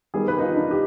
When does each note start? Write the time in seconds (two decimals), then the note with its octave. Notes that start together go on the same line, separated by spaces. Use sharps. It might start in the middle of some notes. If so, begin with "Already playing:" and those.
0.14 D#3 G3 B3 G#4
0.28 B4
0.39 D#4
0.42 F4
0.56 D4
0.71 G4